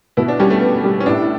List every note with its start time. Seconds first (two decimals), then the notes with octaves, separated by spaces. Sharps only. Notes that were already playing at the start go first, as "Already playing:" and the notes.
0.17 B2 E4
0.28 D4
0.40 G3 C#4
0.50 A3
0.61 B3
0.84 G3
1.00 C#4
1.06 A2 D4